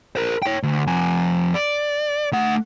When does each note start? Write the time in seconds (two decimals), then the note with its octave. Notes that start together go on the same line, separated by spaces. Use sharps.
0.16 A#4 C5
0.42 C#5 G5
0.63 D2
0.87 F2 G#5
1.54 D5
2.33 A3 F#5